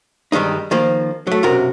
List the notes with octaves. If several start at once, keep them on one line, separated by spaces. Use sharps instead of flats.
G2 D#3 G3 G#3 D#4
D#3 F3 A#3
F#3 A3
B1 F#2 C3 F#4 A#4